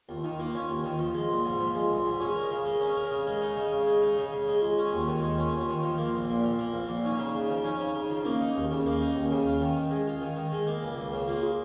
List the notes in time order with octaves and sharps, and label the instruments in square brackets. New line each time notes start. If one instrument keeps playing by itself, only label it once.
[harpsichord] D#2 [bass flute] F4
[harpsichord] D#3 [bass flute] D#4
[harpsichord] A#3 [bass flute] F4
[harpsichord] C#4
D#2
D#3
[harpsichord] F3 [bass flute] F4
[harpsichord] G#3
A#1
G#2
F3
G#3
A#1
G#2
[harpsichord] C#4 [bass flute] G#4
[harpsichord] A#4
C#3
G#3
C#4
A#4
C#3
G#3
D#4
C#3
C#3
G#3
D#4
C#3
C#3
G#3
[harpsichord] G#3 [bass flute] F4
[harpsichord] C#4
D#2
D#3
G#3
C#4
D#2
D#3
F3
A#3
A#1
A#2
F3
A#3
A#1
A#2
[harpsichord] C#4 [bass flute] D#4
[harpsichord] C#3
C#3
F3
C#4
C#3
C#3
F3
[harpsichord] A#3 [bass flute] C#4
[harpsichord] D#4
D#2
C#3
A#3
D#4
D#2
C#3
F4
D#3
D#3
G#3
F4
D#3
D#3
G#3
A#3
C#2
C#2
C#3
[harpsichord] A#3 [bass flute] F4
[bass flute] G#4